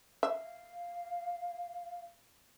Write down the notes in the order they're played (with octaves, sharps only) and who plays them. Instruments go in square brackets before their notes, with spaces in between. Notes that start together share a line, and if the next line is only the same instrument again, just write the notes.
[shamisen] E5 [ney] F5